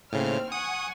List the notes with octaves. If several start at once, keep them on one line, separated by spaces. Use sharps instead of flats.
D#2 A2 C#3 C4 F6
F#5 G#5 C#6 D#6